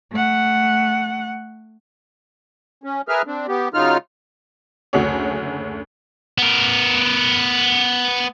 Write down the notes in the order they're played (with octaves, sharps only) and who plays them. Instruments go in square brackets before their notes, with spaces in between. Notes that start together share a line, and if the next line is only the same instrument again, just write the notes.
[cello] A3 F#5
[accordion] C#4
G#4 A#4 B4 E5 F6
C4 D4
B3 G4
C#3 F#3 D#4 F4 F6
[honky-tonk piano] F#1 D2 A3 F#4 G#4 C#5
[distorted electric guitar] B3 A#4